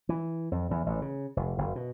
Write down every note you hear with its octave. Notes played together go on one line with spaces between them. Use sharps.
E3
F2
E2
A1
C#3
F1
F#1
B2